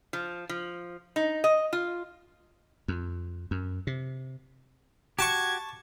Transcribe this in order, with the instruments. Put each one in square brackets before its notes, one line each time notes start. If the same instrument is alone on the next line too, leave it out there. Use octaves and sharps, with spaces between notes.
[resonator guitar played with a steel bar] F3
F3
D#4
D#5
F4
[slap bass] F2
F#2
C3
[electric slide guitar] F#4 G4 [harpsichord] A5 C#6 [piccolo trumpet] G#6